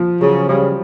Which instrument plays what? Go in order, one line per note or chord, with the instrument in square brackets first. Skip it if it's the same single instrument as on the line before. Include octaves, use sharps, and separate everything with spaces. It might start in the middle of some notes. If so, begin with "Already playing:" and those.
Already playing: [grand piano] F3
[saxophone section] C#3 [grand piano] F#3
[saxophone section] C#3 [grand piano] G3